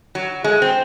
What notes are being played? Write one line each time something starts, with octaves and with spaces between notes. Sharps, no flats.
F#3
G#3
C4